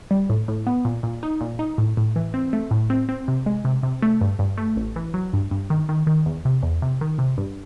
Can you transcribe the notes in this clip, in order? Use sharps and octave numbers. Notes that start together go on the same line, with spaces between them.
G3
A2
A2
B3
A#2
A#2
D#4
A#2
D#4
A2
A2
E3
C4
A3
A2
C4
C4
C3
G#3
C3
C3
A3
G2
G2
A3
A1
E3
F#3
G2
G2
D#3
D#3
D#3
E2
C3
E2
C3
D#3
C3
G2